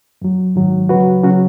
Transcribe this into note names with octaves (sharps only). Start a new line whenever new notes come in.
F#2 F#3
G#2 D#3 F#3
C#2 C#3 F#3 F#4 B4
C#3 F#3 C#4 F#4